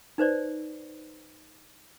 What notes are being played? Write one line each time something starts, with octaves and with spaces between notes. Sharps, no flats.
D#4 B4 C5 D5